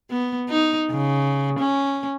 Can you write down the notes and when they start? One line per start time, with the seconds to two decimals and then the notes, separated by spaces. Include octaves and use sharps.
0.10 B3
0.49 D#4
0.91 C#3
1.59 C#4